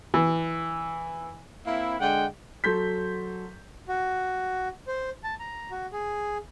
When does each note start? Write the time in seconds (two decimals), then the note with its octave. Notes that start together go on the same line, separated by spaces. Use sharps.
0.14 E3
1.65 A#3 C4 E4
1.98 D3 G#3 F#5 G5
2.64 F#3 A4 C6 G6 B6
3.89 F#4
4.88 C5
5.24 A5
5.40 A#5
5.71 F#4
5.93 G#4